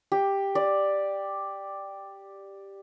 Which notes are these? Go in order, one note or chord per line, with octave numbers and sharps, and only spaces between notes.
G4
D5